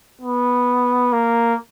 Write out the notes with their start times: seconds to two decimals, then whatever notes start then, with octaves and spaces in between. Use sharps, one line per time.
0.22 B3
1.13 A#3